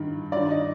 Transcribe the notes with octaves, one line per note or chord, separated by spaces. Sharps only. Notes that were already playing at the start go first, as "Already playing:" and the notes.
Already playing: G2 D#3
G2 D#3 D5
D#5